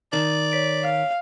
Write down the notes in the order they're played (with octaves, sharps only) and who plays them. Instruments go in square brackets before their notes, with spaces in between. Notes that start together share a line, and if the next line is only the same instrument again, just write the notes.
[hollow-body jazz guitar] D#3 [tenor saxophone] D5
[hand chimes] C#5 B6 D7
[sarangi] F5